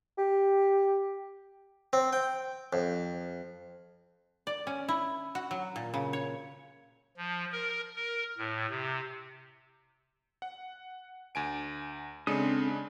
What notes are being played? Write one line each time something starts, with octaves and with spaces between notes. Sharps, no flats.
G4
C4
G5
F2
D5
C#4
E4
F#4
F#3
A#2
C#3
C#5
F3
A#4
A#4
A2
C3
F#5
D2 G#5 D7
C#3 G#3 C4 D4 A4 D#6